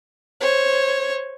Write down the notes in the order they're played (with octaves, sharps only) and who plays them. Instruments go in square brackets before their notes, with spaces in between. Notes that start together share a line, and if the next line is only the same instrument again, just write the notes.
[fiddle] C5 C#5